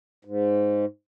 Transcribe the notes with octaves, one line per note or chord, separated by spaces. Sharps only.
G#2